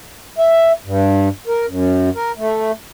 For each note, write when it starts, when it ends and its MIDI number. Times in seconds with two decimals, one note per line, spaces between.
0.38 0.72 76
0.84 1.29 43
1.47 1.66 70
1.67 2.10 42
2.15 2.32 70
2.37 2.72 57